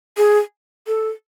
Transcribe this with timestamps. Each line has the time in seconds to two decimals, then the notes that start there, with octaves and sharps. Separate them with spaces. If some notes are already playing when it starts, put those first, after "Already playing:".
0.17 G#4
0.87 A4